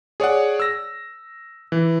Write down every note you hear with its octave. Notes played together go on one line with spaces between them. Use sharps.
G#4 C#5 D5 F#5
E6 A#6
E3